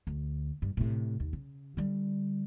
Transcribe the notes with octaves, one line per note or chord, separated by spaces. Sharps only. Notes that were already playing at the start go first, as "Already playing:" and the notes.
D2
G2
A2 C3
D#2
C#3
D3 G3